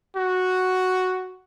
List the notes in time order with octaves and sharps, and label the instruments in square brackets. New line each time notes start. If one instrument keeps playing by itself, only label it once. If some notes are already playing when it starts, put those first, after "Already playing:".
[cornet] F#4